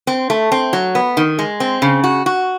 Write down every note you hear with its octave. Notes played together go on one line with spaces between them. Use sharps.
C4
A3
C4
F#3
B3
D#3
G#3
C4
C#3
F#4
F#4